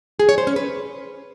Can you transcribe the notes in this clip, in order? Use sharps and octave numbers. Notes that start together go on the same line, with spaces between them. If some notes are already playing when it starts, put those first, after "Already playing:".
G#4
C#5
C5
C#4
B4